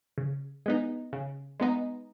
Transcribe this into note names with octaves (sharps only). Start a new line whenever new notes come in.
C#3
G#3 B3 D#4
C#3
G#3 B3 D#4